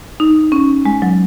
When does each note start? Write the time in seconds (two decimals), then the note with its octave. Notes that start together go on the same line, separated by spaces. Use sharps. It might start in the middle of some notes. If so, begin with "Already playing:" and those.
0.20 D#4
0.52 C#4
0.85 G#3
1.02 F#3